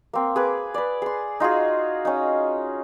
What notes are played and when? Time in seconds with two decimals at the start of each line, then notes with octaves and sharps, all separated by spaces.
0.13 A#3 C4
0.36 G#4 B4 D6
0.74 B4 D5
1.02 G#4 C6
1.40 D#4 F4 F#4 G#4
2.05 C#4 D#4